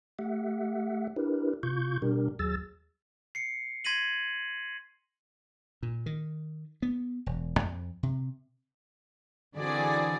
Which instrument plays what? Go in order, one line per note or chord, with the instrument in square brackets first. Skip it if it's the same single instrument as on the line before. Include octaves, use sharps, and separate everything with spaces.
[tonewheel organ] A3 G4 E5 F#5
D4 E4 G4 A#4 B4
C3 F4 C#6 G6
B2 G3 D4 G4 A#4
D#2 F#3 G#4 E6 A6
[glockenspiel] C7 C#7
C6 G#6 A#6 B6 D#7 F#7
[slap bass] A#2
D#3
B3
E1
F2
C3
[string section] D3 E3 C4 F#4 G#4 D5